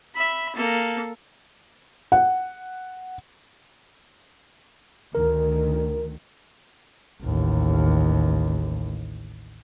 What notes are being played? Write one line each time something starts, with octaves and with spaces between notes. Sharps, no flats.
E5 B5
A#3 A4
F#5
D2 D#3 A#4
A1 D#2